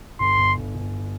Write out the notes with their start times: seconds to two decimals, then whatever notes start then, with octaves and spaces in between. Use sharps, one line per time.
0.20 G1 C6
0.38 G1
0.57 G1
0.75 G1